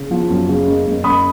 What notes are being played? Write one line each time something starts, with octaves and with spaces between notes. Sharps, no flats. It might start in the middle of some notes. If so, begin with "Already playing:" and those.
Already playing: C#3
F3
F#2
C#3
F#1
F#1
F#1 B5 D#6